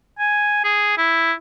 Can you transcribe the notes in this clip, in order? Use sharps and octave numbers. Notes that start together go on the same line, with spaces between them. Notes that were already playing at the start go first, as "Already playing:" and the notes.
G#5
G#4
E4